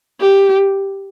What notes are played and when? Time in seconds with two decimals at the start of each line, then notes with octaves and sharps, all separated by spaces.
0.21 G4